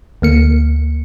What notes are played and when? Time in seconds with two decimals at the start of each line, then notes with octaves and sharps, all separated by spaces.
0.22 D2 A#3 C#7